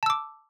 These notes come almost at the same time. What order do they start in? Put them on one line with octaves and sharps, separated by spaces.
A5 E6 D6